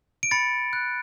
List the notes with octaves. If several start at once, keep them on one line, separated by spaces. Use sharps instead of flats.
D7
B5 A6 C#7
F#6